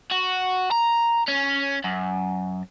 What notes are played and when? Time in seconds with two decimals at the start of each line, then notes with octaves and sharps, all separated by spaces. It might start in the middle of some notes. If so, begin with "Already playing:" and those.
0.12 F#4
0.72 A#5
1.28 C#4
1.84 F#2